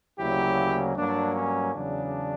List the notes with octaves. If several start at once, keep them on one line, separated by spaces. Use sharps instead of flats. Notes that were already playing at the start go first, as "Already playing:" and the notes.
D2 C#3 F#3 A#3 E4 G4
G2 F#3 A#3 D4
C#4
E2 C#3 F#3 D4